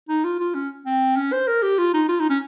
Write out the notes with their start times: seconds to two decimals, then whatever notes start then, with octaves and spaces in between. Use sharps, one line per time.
0.09 D#4
0.24 F4
0.40 F4
0.55 C#4
0.86 C4
1.16 C#4
1.33 C5
1.47 A#4
1.62 G4
1.78 F4
1.94 D#4
2.09 F4
2.20 D#4
2.29 C#4